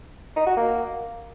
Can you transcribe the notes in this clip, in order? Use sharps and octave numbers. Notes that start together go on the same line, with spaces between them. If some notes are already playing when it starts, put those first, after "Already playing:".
D#4
F#4
A#3